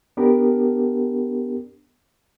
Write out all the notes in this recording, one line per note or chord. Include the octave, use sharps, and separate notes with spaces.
B3 D4 G4 A#4